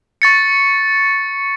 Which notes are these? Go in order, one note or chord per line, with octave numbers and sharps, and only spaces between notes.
C#6 A6 C#7